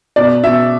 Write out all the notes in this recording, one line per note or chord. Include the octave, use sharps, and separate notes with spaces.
B2 D5
B2 E5